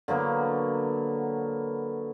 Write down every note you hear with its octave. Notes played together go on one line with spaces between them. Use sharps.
D3 F#3 A#3 B3